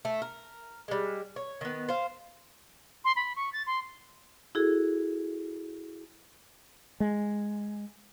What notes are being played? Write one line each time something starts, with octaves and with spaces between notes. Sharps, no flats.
A3
A#4
G3 G#3
C#5
D#3 B3
C5 F5
C6
B5
C#6
A6
C6
E4 F#4 G#4 A4
G#3